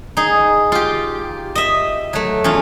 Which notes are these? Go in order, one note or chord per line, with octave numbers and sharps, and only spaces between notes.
D#4 G#4
F4 G4
D#5 E5
F#3 A3
E2 C#4 F4